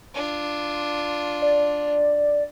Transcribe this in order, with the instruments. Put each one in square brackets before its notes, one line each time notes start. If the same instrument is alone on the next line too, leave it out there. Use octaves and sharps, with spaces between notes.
[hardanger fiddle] D4 F4
[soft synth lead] D5